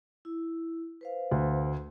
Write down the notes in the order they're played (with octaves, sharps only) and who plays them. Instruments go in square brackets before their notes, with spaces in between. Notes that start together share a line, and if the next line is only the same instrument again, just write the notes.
[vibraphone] E4
B4 C5 F5
[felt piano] D2